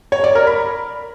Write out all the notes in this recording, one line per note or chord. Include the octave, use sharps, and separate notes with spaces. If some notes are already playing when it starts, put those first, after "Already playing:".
C#5
D5
A#4
B5